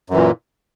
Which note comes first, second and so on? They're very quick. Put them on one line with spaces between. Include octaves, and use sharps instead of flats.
F#2 E3 A#2